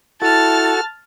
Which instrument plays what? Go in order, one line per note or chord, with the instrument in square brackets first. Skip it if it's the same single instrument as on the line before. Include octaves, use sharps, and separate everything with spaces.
[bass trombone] E4 [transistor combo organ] F#4 A4 [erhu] A5 [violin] F6 A6